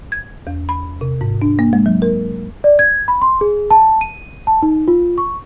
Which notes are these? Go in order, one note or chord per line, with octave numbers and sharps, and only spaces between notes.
G#6
E2
B5
C3
G#2
D4
A#3
G#3
F#3
A#4
D5
G#6
B5
C6
G#4
A5
D#7
A5
D#4
F4
C#6